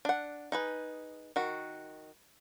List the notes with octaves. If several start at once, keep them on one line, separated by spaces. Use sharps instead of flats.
D4 F#5
D#4 G#4 B4
D#3 F#4